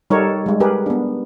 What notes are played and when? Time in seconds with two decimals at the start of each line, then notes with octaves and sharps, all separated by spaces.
0.10 G3 D#4 G4 A4 A#4 C#5
0.46 G3 G#3
0.60 G4 G#4 A#4 B4
0.86 B3 D4